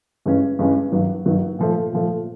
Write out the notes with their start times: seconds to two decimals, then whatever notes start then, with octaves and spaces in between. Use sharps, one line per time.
0.26 G2 E3 G#3 C#4
0.59 G2 E3 G#3 C#4
0.92 G2 D#3 F#3
1.26 G2 D#3 F#3
1.59 A#2 F3 A3
1.92 A#2 F3 A3